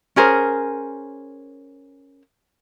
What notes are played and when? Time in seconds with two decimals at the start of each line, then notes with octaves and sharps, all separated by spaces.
0.16 C#4 G#4 A#4 C5